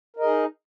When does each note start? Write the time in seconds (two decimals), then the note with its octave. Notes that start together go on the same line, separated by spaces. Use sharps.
0.16 A#4
0.19 D#5
0.22 G#4
0.25 D#4